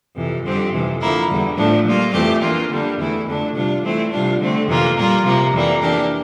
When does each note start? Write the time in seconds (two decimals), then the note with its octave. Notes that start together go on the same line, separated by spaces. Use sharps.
0.15 F2 C3 E3
0.44 F2 D3 G3 C4 G4
0.72 F2 C3 E3
1.00 D3 F3 A#3 E4
1.29 E2 D3 G3
1.57 A2 F3 A3 D4
1.85 A#2 G3 A#3 F4
2.13 F2 E3 A3 C4 G4
2.42 E3 A#3 D4 F4
2.70 D3 G3 A#3 D4
2.98 E2 E3 A3 E4
3.26 F2 D3 A3 D4
3.55 C3 G3 D4 F4
3.83 E3 A3 C4 E4
4.12 C3 G3 D4 F4
4.40 D3 A3 C4
4.68 F2 C3 E3 A#3 F4
4.96 A#2 G3 A#3 F4
5.25 C3 F3 A#3
5.53 F2 E3 G3 A#3
5.81 E3 A#3 D4 G4